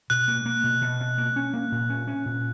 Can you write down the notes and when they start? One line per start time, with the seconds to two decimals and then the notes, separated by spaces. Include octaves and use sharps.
0.10 B2 F#6
0.28 A#3
0.46 A#3
0.64 B2
0.81 B2
1.00 B2
1.18 A#3
1.36 C#4
1.53 A#3
1.72 A#2
1.90 C#4
2.07 C#4
2.25 A#2